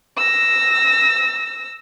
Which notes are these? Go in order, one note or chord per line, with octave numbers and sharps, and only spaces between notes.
E6 A#6